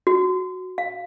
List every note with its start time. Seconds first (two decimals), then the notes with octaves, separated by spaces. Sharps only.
0.07 F#4
0.78 F5